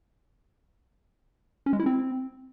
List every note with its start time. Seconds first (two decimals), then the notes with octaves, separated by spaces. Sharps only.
1.66 C#4
1.73 G#3
1.79 E4
1.86 C4